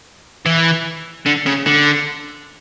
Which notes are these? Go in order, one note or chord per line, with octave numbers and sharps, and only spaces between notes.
E3
D3
C#3
D3